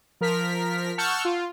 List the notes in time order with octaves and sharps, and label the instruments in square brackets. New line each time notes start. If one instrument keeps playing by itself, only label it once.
[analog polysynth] F3 A#4 F6 B6
F#5 A5 C#6 E6 F6 G6
F4